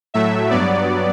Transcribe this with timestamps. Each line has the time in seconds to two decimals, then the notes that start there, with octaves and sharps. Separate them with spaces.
0.14 A2 F#3 A3 E5
0.50 G2 F#3 B3 D5